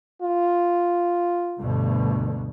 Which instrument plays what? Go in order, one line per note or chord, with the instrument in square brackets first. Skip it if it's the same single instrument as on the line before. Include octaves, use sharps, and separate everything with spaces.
[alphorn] F4
[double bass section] D2 G2 B2